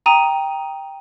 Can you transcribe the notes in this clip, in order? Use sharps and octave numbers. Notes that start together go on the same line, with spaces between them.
G5 A#5 D#6 D#7